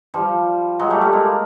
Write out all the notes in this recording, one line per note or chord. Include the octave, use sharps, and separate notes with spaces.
F3 G3
F#3 G#3
G3 A3
G3 A3
G#3 A#3